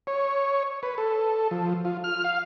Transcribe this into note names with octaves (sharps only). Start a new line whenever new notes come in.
C#5
B4
A4
F3
F4
F6
F5